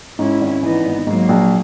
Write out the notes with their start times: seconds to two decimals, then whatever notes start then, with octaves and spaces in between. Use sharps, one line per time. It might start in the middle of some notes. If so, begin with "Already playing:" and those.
0.19 G#2 C#4 E4
0.41 G#1
0.63 E3 B3 D#4
0.85 G#1
1.06 G#2 F#3 A#3
1.29 A#1